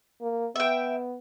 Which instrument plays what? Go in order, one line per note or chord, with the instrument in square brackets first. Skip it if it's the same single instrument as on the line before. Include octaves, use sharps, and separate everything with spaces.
[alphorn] A#3
[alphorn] B3 [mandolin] E5 G5